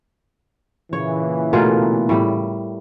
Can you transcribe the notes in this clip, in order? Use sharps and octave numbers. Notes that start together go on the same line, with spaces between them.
A#2 C#3 E3 C#5
B2 A3 F4 G#4 A#4
A2 G3